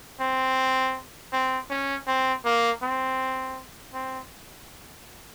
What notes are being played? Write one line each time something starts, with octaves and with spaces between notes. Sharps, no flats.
C4
C4
C#4
C4
A#3
C4
C4